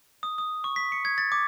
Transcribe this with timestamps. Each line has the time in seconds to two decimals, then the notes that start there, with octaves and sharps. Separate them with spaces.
0.23 D#6
0.38 D#6
0.64 C#6
0.76 B6
0.92 C#7
1.05 G#6
1.18 A6
1.32 D6